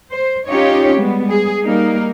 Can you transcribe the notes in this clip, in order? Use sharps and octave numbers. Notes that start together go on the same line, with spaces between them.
C5
C#4 D#4 F4 G4 C#5
G3 G#3 B3
G#4
G3 A#3 D#4 A#4